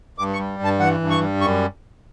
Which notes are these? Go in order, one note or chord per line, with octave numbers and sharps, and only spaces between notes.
G2 D6
C#6
G3
G2 A5
E3 F#5
G2
C#6
G3
F#2 C#6